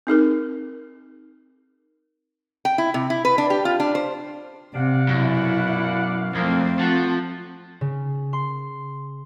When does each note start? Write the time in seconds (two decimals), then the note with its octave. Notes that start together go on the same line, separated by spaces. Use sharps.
0.07 C4 D#4 G#4 A#4
2.65 G5
2.78 E4
2.94 C3
3.10 E4
3.25 B4
3.38 D4
3.50 G4
3.65 F4
3.80 D4
3.95 C5
4.75 C3 D5 F5 F#5
5.08 F#2 B2 E4
6.35 F2 A3 A#3 C4
6.79 F3 F#4 F#5 A5
7.81 C#3
8.33 C6